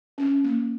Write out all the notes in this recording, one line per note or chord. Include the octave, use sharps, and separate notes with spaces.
C#4
A#3